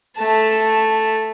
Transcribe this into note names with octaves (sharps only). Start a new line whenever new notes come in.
A3 A5